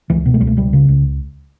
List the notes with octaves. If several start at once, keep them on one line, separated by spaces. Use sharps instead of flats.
C#2 E3
B2
A3
C#2 G3
A3
C#2 G3
C#3
C#2